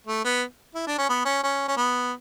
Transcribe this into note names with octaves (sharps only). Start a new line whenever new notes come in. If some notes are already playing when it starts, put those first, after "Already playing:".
A3
B3
E4
D4
C#4
B3
C#4
C#4
C#4
B3